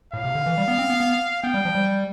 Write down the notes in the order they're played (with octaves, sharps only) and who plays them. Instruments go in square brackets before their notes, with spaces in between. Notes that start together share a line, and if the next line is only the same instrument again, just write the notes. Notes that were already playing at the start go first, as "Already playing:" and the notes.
[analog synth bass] A2 [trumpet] F5
[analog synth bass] C3
D3
E3
G3
B3
C4
B3
B3
[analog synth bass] B3 [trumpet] G5
[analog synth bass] G3
F3
G3